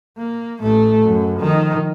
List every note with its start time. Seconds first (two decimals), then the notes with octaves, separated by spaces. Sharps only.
0.18 A#3
0.61 A1 A3
1.03 F#2
1.37 D#3 F3